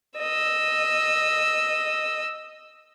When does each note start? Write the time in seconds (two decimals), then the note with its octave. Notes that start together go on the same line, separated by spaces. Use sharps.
0.18 D#5 E6